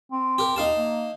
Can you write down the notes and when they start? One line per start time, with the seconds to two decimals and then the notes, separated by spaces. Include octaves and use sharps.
0.12 C4
0.38 G4 A#4
0.56 D#2 D#4 F5 A5
0.76 A#3